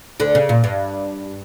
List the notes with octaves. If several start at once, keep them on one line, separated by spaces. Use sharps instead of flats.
D2 D3
C#3
A#2
G2